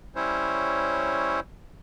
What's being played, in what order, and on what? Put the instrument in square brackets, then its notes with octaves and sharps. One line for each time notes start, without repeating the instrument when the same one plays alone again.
[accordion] G3 C#4 E4 C5 C#5